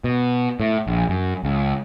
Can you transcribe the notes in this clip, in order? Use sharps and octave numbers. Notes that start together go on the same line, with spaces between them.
B2
A2
A#1
F#2
C#2